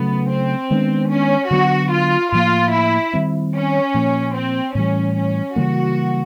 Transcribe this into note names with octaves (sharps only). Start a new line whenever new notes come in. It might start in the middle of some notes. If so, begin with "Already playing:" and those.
Already playing: C#3 F#3 A3 B3
C4
D#3 G#3 B3 D4
C#4
D3 F#3 B3 D4 F#4
F4
A2 F3 A#3 F4
E4
D#3 G3 C4
C#4
A#2 F3 A#3
C4
A2 E3 G3 C#4
C#4
C#3 E3 G3 A#3 F#4